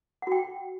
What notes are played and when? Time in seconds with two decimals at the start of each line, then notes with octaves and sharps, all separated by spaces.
0.22 F#5
0.27 F#4
0.32 G5